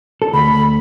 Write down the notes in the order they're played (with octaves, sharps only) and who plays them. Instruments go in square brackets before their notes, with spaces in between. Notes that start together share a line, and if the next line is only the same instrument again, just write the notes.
[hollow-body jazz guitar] A4
[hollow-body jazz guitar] D2 [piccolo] B5